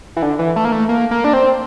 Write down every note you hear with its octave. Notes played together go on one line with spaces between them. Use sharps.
E3
D3
E3
A3
A#3
A3
A#3
A#3
D4
C4